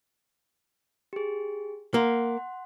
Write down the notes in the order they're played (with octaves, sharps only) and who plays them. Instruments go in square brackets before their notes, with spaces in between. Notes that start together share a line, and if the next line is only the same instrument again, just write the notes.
[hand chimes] G4 G#4
[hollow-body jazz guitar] A#3 [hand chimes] F#5 C6